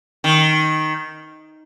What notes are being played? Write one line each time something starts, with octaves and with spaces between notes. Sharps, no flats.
D#3